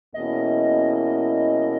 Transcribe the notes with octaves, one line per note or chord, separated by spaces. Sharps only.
E2 B2 A#3 C#4 E4 D#5